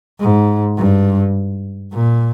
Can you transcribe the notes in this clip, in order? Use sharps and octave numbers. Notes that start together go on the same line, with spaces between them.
G#2
G2
A#2